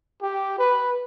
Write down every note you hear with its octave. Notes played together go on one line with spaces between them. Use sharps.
G4
B4